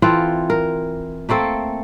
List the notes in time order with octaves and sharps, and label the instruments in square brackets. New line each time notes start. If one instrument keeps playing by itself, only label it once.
[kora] E3 C4 F4 A4
A#4
A3 A#3 C4 A4